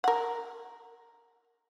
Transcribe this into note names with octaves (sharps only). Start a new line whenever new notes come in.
A#4 F#5